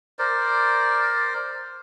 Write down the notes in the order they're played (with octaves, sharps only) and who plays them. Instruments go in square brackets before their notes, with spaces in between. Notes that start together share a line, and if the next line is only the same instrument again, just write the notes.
[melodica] A#4 C5 D5